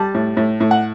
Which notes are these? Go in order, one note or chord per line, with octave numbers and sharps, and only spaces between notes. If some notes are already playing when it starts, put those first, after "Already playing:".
Already playing: G3 A5
A2
A2
A2
F#5